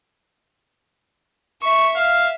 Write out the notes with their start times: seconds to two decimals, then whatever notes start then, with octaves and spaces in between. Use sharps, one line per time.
1.62 E5 C#6
1.96 F5